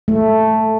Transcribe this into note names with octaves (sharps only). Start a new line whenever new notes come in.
A3